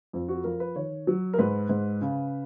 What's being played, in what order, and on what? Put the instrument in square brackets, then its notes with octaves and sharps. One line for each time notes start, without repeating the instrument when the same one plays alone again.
[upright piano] F2
F#4
F3 A#4
B4
D#3 C#5
F#3
A#4
G#2 B4
G#2
C#3